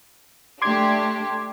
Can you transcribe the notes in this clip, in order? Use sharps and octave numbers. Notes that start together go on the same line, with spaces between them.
A3 D4 G4 C6 D6 G#6